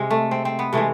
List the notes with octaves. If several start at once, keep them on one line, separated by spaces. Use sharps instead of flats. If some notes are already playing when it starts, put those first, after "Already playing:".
Already playing: C3 G#3
A3
C4
C4
B3
C3 E3 G#3 A3